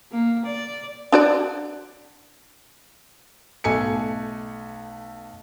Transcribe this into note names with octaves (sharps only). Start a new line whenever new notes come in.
A#3
D5
D4 F#4 D5
B1 A3 G#5 C#7